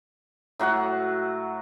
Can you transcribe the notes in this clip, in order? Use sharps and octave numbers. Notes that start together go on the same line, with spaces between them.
A2 F#3 F#4 F#5